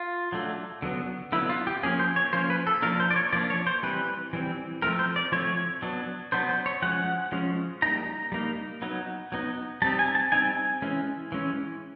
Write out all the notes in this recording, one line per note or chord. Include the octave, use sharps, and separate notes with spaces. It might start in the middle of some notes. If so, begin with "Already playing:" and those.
Already playing: F4
F#3 A3 D4
D3 F#3 B3
D3 F#3 B3 E4
F4
G4
F3 A#3 C#4 G#4
C5
C#5
F3 A#3 C#4 C5
B4
A4
F3 A#3 D4 A#4
C5
D5
C#5
F3 A#3 D4 D5
C#5
C5
E3 G3 C4 B4
E3 G3 C4
F3 A3 C4 A#4
C5
D5
F3 A3 C4 C#5
F#3 B3 D4
F#3 B3 D4 C5
C5
C#5
F3 G#3 C#4 F#5
F3 G#3 C#4
G3 A#3 D#4 A#5
G3 A#3 D#4
F#3 B3 D#4
F#3 B3 D#4
G3 C4 D#4 A5
G#5
A5
G3 C4 D#4 G#5
E3 G#3 C#4
E3 G#3 C#4